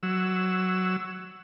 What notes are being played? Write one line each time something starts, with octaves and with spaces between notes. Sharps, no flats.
F#3 E6